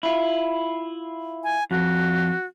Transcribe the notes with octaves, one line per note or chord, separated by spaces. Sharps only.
E4 F4
G#5
F2 F#4